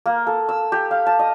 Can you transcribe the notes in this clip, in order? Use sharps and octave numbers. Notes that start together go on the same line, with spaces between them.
A#3
A4
E6
G4
F5
A5
D#5